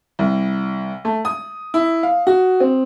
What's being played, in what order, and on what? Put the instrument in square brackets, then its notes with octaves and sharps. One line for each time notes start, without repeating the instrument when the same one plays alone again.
[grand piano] C2
A3
D#6
E4
F5
F#4
C4